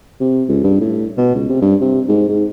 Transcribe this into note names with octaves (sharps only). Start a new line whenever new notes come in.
C3
C#2
G2
A2
B2
C#2
C3
G2
C3
G#2
G#2